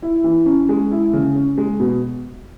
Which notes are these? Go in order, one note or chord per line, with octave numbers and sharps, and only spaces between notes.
E4
E3
C#4
G#3
E4
C#3
C#4
G#3
B2